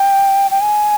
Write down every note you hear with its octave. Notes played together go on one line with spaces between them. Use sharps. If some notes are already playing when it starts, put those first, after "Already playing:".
Already playing: G5
G5
G#5